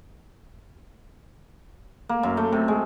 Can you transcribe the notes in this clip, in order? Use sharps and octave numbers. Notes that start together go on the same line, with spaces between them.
A#3
F#2
A3
C3
G#3